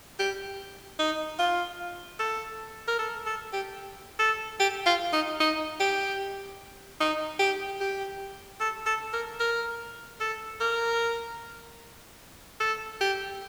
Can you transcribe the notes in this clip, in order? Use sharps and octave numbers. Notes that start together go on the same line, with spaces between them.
G4
D#4
F4
A4
A#4
A4
A4
G4
A4
G4
F4
D#4
D#4
G4
D#4
G4
G4
A4
A4
A#4
A#4
A4
A#4
A4
G4